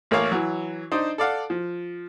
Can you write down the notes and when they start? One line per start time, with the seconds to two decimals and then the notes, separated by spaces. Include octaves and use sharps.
0.11 A1 A#3 C#5 F5 D6
0.32 E3 F#3
0.92 D4 D#4 C5
1.18 A4 D5 F5 F#5
1.50 F3